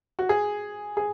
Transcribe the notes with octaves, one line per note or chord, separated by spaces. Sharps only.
F#4
G#4
G#4